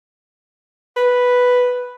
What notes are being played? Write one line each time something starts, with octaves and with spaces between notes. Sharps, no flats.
B4